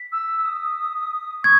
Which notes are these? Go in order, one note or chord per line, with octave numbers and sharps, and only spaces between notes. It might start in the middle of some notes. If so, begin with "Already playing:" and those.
Already playing: B6
E6
D#6
D#6
C#6 G#6